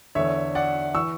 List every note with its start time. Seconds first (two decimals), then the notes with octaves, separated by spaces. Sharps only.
0.15 E2 D3 C#5 E5
0.55 D5 F#5
0.94 E3 C#6 E6